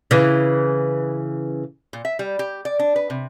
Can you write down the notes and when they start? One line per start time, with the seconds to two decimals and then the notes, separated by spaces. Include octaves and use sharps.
0.11 C#3 E3
1.93 A#2
2.05 E5
2.19 G3
2.39 G4
2.65 D5
2.79 D4
2.96 B4
3.10 C3